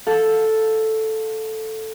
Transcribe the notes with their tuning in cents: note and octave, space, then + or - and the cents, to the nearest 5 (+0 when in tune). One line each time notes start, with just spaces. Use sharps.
A4 +0 F5 +30